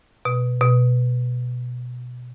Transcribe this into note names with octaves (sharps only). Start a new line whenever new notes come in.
B2
B2